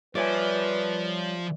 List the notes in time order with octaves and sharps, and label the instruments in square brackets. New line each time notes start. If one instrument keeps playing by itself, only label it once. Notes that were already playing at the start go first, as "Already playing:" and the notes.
[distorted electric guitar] F3 [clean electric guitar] G3 C#5 [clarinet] B4 [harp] D5 E5 G#5